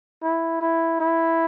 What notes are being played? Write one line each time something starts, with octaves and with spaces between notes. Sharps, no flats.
E4
E4
E4